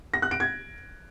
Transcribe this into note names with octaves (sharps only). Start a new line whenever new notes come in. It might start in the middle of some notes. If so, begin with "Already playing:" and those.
A#6
F#6
D7
G#6